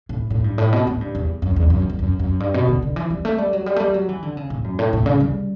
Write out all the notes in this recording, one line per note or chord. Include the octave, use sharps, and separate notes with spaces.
A2
A2
G2
A2
B2
A2
G2
E2
F#2
E2
F#2
E2
F#2
F#2
G2
B2
D3
D3
E3
G3
A3
G3
F#3
G3
A3
G3
F#3
E3
D3
C#3
A2
F#2
A2
A2
C#3
G3